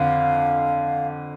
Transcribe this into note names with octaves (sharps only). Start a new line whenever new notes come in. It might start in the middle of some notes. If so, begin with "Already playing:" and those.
Already playing: F2 D3 F5